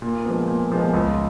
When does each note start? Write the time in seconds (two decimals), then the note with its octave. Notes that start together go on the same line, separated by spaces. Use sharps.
0.02 A#2
0.25 F3 G#3 B3
0.48 A#2
0.72 F3 G#3 B3
0.93 C#2